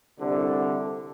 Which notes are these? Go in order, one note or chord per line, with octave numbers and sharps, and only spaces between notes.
C2 D3